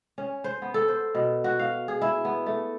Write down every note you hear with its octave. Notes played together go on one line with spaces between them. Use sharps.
C#4
C5
B3
A4
C5
B2
F#4
F5
G#4
E4
B3
A3